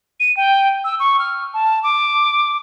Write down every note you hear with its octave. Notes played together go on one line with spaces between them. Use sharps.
D#7
G5
E6
C#6
F6
A5
D6